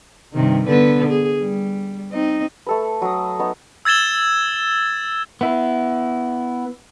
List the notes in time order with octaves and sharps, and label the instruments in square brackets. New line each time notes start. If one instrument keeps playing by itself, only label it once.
[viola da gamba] G2 C3 D#3
D3 B3 B4
G#4
G3
C4 D#4 D#5
[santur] A3 A4 B4
F#3 D#6
B3 D#4 C#6
[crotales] E6 G#6 A6 E7 G7
[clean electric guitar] B3 E4